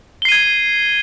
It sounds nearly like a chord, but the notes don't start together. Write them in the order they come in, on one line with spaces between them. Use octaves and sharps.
G7 C7 D#7 G#6